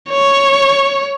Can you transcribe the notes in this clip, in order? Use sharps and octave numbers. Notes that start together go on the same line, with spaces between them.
C#5